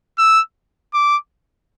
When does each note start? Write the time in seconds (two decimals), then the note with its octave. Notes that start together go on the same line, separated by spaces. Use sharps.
0.18 E6
0.94 D6